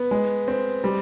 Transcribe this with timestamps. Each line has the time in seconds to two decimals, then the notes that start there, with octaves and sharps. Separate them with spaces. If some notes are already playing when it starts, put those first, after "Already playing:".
Already playing: B3
0.11 G#3
0.48 C4
0.84 G3